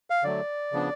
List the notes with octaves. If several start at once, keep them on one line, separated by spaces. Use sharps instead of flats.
F5
D3 F#3 A3 D5
C#3 F3 B3 D4